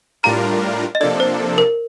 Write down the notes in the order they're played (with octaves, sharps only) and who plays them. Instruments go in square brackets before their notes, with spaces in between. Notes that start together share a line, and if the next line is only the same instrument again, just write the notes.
[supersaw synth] A2 G3 D4 F4 A#4 [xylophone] A#5
[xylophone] D#5
[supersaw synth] C3 F3 A#3 D4 A4 [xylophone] D5
[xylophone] C5
A#4